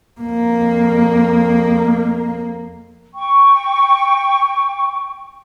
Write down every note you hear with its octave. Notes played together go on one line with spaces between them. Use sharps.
F2 A#3
G5 C#6